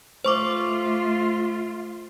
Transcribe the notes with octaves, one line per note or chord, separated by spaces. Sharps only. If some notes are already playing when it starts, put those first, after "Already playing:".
A3 F4 C5 C#6 D6